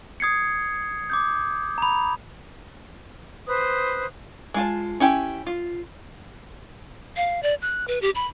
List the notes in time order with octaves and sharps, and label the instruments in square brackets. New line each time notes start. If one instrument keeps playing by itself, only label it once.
[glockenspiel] D#6 G#6 C7 C#7
D6 D#6 G6
A#5 B5
[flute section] B4 C5 D#6
[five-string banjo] G#3 F4 A5
C#4 E4 G4
F4
[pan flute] F5
D5
F#6
B4
G4
B5